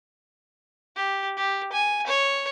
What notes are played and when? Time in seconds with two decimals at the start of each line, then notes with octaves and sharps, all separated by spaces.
0.96 G4
1.37 G4
1.72 G#5
2.07 C#5